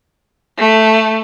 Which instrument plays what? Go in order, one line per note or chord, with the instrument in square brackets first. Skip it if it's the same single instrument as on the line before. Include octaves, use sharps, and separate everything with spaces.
[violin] A3